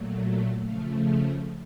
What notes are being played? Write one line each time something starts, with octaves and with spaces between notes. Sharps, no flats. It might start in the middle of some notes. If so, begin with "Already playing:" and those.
Already playing: A#2 F#3 A3
C#3 F3 A3 F5
F5